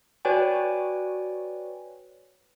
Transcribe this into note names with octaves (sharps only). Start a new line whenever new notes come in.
F#4 B4 C#5 D5 G5 G#5